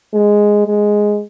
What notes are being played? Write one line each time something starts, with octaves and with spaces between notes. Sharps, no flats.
G#3
G#3